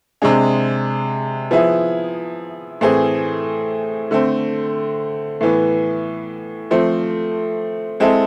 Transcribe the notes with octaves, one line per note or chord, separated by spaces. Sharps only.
C3 G#3 D4 G#4
F3 B3 E4 G#4
A2 E3 A3 C4 G#4
D3 A3 C4
A2 E3 B3
F3 A3 C4
G#3 C4 E4 A4